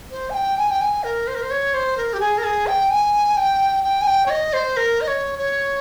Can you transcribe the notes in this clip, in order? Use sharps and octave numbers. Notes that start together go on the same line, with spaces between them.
C5
G#5
G5
G#5
G5
G#5
A#4
C5
A#4
C5
C#5
C5
A#4
G4
G#4
A#4
G#4
G5
G#5
G5
G5
G#5
G5
C#5
D#5
C5
A#4
D#5
C#5
C#5